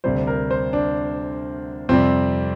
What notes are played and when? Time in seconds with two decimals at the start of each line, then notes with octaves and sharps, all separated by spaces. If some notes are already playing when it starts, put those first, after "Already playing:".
0.04 D2 C3 G3 C5
0.27 A#4
0.51 C5
0.73 D4
1.89 F2 C3 G3 C4